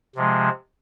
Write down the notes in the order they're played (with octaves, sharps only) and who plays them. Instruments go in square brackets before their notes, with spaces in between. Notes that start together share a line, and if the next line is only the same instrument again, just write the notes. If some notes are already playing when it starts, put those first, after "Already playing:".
[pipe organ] C3 F3 G#3